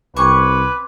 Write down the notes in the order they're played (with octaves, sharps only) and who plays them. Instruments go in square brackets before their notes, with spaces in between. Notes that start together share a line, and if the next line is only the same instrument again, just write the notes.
[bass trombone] C2 [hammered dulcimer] C4 G#5 D6 [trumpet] B4 [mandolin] C#6